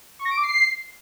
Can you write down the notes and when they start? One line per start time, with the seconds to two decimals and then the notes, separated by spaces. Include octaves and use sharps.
0.19 C#6
0.25 A#6
0.31 D7
0.37 D6
0.43 C7